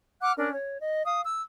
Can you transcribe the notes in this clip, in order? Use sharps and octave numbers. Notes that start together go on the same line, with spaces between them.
F#5 D6 F6 F#6
C#4 D4 A#4
C#5
D#5
F5 D#6
E6